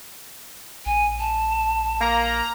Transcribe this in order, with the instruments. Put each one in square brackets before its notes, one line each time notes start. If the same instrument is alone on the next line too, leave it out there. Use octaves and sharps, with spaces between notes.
[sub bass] A#1 [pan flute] G#5
[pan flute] A5
[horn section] A#3 [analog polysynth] A#5